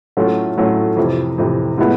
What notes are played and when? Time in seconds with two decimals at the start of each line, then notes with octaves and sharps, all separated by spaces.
0.17 A2 F#3 A3 C#4 F4
0.57 A2 F#3 A3 C#4 F4
0.97 F2 C3 E3
1.38 F2 C3 E3
1.78 A2 F3 G#3 B3 E4